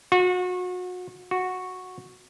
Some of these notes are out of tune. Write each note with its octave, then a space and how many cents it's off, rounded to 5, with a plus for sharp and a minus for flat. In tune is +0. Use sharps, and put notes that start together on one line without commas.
F#4 -35
F#4 -10